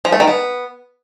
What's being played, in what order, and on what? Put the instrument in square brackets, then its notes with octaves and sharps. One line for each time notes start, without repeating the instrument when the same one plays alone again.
[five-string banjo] F3
A3
D#3
B3